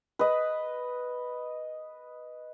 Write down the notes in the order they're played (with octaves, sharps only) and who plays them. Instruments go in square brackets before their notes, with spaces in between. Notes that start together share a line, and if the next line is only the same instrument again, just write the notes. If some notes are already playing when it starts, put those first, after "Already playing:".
[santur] B4 D#5